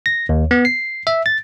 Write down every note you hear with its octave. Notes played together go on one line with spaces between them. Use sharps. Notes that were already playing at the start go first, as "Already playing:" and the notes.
A#6
D#2
B3
C7
E5
A6